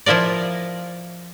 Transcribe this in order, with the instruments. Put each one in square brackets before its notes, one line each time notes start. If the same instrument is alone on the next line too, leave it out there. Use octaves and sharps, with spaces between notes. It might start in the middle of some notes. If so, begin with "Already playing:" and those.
[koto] F3 E4 F4 A#4 D5